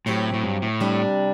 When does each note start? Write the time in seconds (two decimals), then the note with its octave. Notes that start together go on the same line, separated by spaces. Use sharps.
0.06 A2 F#3 C4 G4
0.34 A2
0.44 G2
0.62 A2
0.80 C3 G3 D4